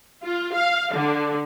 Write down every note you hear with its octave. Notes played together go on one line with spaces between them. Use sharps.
F4
F5
D3